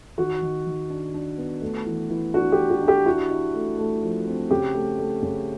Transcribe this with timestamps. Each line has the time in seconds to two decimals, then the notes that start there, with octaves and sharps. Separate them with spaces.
0.17 D#3 F#4
0.42 D#3
0.66 D#3
0.90 D4
1.14 D4
1.38 B3
1.61 A3
1.86 E3
2.10 E3
2.34 D4 F#4
2.52 G4
2.58 E3
2.70 F#4
2.82 D4
2.88 G4
3.06 E4 F#4
3.30 E4
3.54 A3
3.78 A3
4.02 F3
4.27 C4
4.51 C#3 G4
4.74 A3
4.99 A3
5.23 C#3